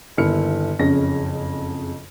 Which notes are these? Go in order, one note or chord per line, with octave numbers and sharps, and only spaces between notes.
G1 D#2 E4 F6 C#7
F#1 F2 C#3 C#4 A#6